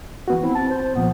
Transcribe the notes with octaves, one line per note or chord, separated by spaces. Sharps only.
E3 B3 F#4
C4 E4
A5
C5
C2 A#2 F3 B3